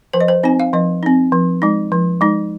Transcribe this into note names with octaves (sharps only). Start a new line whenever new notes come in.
F3 C5
D#5
C5
C4 D#4 G#5
F5
F3 D#5
C4 D#4
F3
G#3 D#4
F3
G#3 D#4